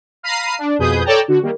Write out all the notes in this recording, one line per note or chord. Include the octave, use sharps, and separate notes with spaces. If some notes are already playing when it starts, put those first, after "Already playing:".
F5 A#5 B5 C7 D#7
D4
F2 B2 G#4 B4 D#6 G6
A4 C#5 D5 G5 A5 A#5
D3 F#4
D#3 G3 A#3